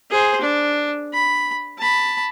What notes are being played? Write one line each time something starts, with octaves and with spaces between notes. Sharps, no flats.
G#4 C5
D4
B5
A5 B5